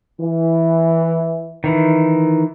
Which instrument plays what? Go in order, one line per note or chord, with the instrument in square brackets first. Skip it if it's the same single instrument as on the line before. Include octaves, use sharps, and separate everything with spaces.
[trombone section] E3
[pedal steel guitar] D#3 E3